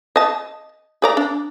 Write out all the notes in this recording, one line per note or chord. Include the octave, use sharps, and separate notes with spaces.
D#5 A5
G#4 D5 A#5
D4